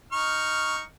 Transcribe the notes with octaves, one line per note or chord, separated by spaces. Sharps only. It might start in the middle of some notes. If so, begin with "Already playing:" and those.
D#4 C#6 F6